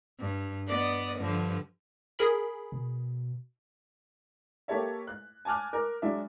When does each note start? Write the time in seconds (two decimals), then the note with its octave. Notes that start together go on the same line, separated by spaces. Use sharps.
0.19 G2
0.66 B3 D5 D#5
1.19 G2 D3 F3
2.19 G#4 A#4 B5
2.72 B2
4.68 A#3 G4 A4 C#5 E5
5.07 F#6
5.45 G#5 A5 D6 F6 F#6
5.73 A#4
6.02 F#3 G#3 D4 E5